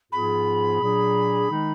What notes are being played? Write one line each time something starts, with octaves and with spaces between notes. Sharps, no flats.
G#2 F3 B3 F4 G#4 B5
A#2 F#3 D4 G#4
D#3 G#3 D#4